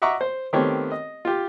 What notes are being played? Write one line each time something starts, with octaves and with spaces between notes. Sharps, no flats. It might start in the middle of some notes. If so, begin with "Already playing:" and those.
D#5 E5 F#5 A#5 C#6 D6
C5
D#3 A3 B3 C4 G4 C#5
D#5
F4 G4